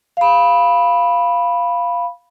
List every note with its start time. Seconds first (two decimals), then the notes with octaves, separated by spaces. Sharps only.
0.17 F5 B5